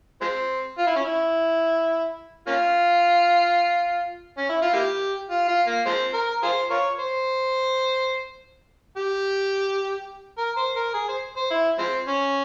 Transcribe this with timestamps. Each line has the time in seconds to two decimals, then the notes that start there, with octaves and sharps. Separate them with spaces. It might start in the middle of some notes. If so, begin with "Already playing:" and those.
0.21 F3 G#3 C4
0.78 F4
0.87 E4
0.95 C#4
1.05 E4
2.47 A#3 C#4 F4
4.37 C#4
4.49 E4
4.62 F4
4.73 A#3 E4 G4
5.30 F4
5.48 F4
5.67 A#3
5.86 F3 G#3 C4
6.14 A#4
6.43 F4 G#4 C5
6.70 F4 A#4 C#5
6.99 C5
8.97 G4
10.38 A#4
10.57 C5
10.76 A#4
10.94 G#4
11.08 C5
11.36 C5
11.50 E4
11.78 F3 G#3 C4
12.07 C#4